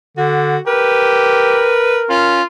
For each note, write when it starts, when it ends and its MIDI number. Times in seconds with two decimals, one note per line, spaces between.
0.17 0.57 50
0.17 0.60 66
0.67 1.78 67
0.67 2.42 70
0.67 2.02 71
2.10 2.41 61
2.10 2.43 65